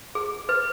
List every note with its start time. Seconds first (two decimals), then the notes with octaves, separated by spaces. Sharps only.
0.15 G#4
0.49 B4